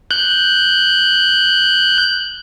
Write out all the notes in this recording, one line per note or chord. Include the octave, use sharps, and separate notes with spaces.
F#6 G6